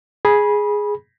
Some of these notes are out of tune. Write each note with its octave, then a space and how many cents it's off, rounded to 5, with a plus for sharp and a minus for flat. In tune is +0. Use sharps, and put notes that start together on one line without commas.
G#4 +0 B5 -25